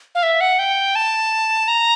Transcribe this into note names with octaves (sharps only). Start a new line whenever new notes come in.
F5
E5
F#5
G5
A5
A#5